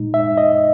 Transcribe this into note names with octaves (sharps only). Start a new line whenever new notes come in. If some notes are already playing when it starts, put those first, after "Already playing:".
Already playing: A#2 G#3 D#4
E5
D#5